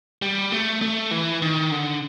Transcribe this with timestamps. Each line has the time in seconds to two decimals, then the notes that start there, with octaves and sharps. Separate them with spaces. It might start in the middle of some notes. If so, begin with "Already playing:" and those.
0.22 G3
0.52 A3
0.82 A3
1.11 E3
1.42 D#3
1.71 D3